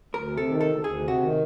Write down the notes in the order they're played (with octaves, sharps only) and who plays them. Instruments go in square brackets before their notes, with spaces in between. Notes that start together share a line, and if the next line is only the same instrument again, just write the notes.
[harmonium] D2 [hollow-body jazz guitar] A#4
[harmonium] C3
[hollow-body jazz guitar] A4
[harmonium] D#3
[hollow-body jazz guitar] A4
[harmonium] D2
[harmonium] D2 [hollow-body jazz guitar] G#4
[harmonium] C3
[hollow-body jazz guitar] F#4
[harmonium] D#3